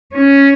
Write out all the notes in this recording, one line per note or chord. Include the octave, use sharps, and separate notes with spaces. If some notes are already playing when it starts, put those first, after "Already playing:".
C#4